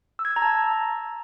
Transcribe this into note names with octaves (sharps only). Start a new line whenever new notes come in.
E6
G#6
E6
A#5
A5